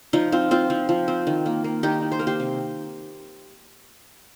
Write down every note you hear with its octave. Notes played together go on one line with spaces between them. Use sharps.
F3 D#4
C4 F4
C4 F4
F3
F3
C4
D#3
A#3
A#3
D#3 D#4 G4
D#3
C5
A#3 A#4
G4 C5
C3